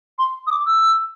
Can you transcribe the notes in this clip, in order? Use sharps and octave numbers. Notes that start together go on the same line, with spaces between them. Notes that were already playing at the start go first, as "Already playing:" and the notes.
C6
D#6
D6
E6